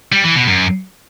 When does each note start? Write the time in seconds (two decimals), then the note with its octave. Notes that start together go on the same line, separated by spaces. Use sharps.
0.12 G3
0.24 E3
0.36 B2
0.48 F#2